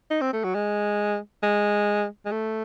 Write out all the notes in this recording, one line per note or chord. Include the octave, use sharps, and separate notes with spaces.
D#4
C4
A3
F#3
G#3
G#3
G#3
A3